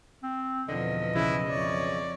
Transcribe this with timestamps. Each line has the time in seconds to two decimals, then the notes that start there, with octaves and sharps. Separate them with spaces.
0.23 C4
0.69 E2 B2 D3 F3 D#5
1.15 B1 C#3 E3 E4
1.49 F2 C#5 D5